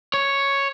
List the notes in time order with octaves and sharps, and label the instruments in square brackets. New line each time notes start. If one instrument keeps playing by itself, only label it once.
[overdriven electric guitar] C#5